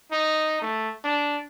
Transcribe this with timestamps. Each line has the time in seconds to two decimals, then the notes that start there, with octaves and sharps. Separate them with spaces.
0.11 D#4
0.62 A3
1.04 D4